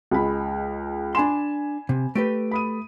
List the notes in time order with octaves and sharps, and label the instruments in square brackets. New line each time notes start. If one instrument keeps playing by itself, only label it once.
[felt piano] C#2 G#3 B5
[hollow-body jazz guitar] D4 C6 [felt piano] G#5 B5 E7
[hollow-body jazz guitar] C3
[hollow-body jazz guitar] A3 G4 B4 [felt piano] D7
[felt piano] B5 D#6 D#7